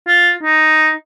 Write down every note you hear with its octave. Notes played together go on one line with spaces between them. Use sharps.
F4
D#4